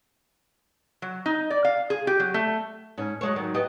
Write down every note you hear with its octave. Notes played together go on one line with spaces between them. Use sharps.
F#3
D#4
D5
F5
G#4
G4
F#3
A3
G#2 C#4
F#3 G#3 C#5
G#2 D#3 F#3
B3 G4 D#5